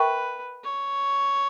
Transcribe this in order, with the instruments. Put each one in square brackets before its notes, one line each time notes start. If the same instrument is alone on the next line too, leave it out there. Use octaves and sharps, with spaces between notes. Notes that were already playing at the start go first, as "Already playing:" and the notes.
Already playing: [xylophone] A#4 E5 G5 C#6 [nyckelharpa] B4
[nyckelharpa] C#5